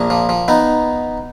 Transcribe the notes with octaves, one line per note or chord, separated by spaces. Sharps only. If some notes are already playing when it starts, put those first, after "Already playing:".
Already playing: A#1 A#3 D4
F3
F3
B3 D#4